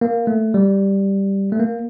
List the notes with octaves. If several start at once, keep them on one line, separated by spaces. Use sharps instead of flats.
A#3
A3
G3
A3
A#3